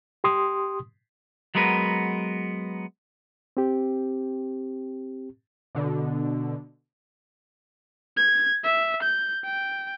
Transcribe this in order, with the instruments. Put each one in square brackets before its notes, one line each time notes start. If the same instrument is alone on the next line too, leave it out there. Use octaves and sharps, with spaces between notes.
[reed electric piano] G4 C6 D#6
[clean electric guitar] F#3 G#3 B3 A#4 B4
[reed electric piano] C4 G4
[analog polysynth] B2 D3
[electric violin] G#6
E5
G6
G5